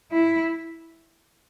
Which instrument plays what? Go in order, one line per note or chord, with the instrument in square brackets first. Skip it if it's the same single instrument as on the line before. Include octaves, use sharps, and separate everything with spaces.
[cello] E4